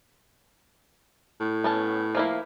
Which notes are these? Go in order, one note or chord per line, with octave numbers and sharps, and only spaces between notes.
A2
B3 C#4 A5
F3 A#3 E4